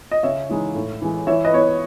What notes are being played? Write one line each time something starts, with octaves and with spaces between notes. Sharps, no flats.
D#5
C#3 C#5 E5
E3 G#3 D#4
A2
E3 G#3
E3 C#5 E5
B4 D#5
B3 E4 C#5
B4